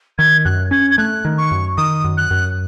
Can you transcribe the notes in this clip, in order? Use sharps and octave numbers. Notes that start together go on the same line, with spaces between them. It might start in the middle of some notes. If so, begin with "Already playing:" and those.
D#3 G#6
F#2 F#6
C#4 G#6
G#6
A3 F#6
D#3
C#6
F#2
D#3 D#6
F#2
F#6
F#2